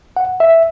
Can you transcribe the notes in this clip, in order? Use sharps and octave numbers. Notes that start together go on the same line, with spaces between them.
F#5
E5